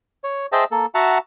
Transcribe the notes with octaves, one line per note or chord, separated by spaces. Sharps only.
C#5
G#4 C5 D#5 E5 G5 A5
A#3 A4
F#4 E5 F#5 A5 A#5